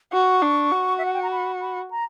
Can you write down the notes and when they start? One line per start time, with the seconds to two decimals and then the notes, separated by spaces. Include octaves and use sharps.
0.13 F#4 C#6
0.42 D4
0.72 F#4
0.98 E5
1.05 F#5
1.14 G5
1.23 A#5
1.31 B5
1.61 B5
1.91 A#5